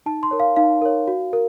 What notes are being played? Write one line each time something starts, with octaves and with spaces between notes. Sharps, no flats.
D#4 A5
C6
A#4 C#5
F5
D#4 F5
A#4 C#5
F#4
A#4